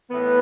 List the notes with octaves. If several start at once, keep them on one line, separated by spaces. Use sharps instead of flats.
A2 E3 B3